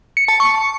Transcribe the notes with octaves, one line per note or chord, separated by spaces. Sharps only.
C#7
A5
C#6